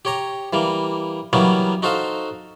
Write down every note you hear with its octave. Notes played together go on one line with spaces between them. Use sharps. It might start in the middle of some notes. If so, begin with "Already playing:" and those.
G4 C#5 A#5
E3 G3 A#3
E3 F#3 G3 A#3 B3 C#4
D#4 F#4 A4 C5 F5